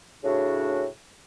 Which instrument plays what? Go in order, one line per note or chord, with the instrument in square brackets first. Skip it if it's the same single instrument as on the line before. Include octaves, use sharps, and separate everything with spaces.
[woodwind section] A2 C#3 D4 F#4